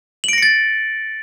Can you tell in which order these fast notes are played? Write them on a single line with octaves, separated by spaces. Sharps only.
F#7 D7 A#6 C#7 A6